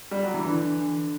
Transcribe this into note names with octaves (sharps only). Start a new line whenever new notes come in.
G3
F#3
E3
D3 E3